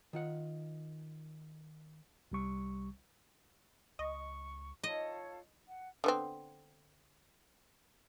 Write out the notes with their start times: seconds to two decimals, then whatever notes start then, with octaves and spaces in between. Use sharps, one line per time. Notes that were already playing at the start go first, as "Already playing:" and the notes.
0.13 D#3 F4 F#5
2.31 C2 G3 C#6
3.99 C#2 D#5 C#6
4.83 F4 A4 C#5 D#5
5.66 F#5
6.04 D3 B3 C4